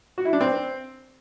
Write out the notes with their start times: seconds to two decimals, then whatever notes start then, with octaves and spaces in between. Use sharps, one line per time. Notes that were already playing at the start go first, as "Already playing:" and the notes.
0.18 F#4
0.25 E4
0.33 D4
0.41 C4